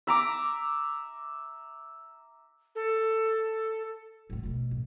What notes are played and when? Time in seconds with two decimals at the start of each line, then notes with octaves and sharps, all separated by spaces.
0.07 E5 A#5 D6
2.75 A4
4.30 A1 D2
4.43 D2 B2
4.71 A1